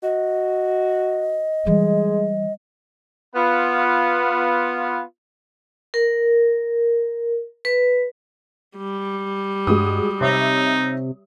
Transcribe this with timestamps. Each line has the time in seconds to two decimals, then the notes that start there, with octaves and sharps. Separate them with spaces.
0.03 F#4 D#5
1.66 E3 G3 G#3
3.36 B3 F4
5.94 A#4
7.65 B4
8.77 G3
9.67 G2 G#3 F#4 D#6
10.21 C3 D#4 C#5 E5